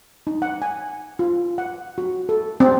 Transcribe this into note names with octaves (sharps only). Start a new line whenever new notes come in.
D#4
F#5
G#5
F4
F#5
F#4
A4
C4